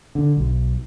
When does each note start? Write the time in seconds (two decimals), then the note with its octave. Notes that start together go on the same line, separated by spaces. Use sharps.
0.15 D3
0.37 B1